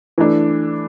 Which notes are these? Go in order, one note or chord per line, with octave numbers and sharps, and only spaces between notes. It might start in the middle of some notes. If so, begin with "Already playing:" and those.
E3 A3 D4